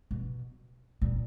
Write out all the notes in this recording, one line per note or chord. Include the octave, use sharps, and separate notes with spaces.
B2
A#2